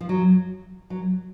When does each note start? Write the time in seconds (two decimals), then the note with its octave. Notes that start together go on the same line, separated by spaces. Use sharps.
0.01 F3
0.09 F#3
0.90 F#3